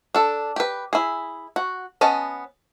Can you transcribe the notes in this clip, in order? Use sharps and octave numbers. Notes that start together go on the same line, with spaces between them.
D4 A4
G4 B4
E4 G#4
F#4
B3 C#4 D#5 A5